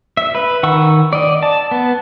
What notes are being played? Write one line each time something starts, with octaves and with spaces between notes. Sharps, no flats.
E5
B4
D#3 F#5 C#6 E6
D5 D#5
A5
B3